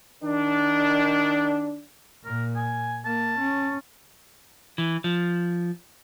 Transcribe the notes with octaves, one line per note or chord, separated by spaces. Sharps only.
D#3 D4
A#2 A#4
G#5
A#3 A5
C#4
E3
F3